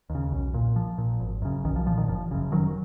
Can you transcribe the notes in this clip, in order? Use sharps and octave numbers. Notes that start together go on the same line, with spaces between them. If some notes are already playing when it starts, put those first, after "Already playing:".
D#2
C#3
B1
A#2
A#1 F3
A#2
G#1
F#2 C#3
B1 D#3
F3
A#2 F3
D#3
F#1 F3
F#2 C#3
F1 D#3 F#3